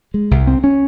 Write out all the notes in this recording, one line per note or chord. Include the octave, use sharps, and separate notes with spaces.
G#3
C2
C4
C#4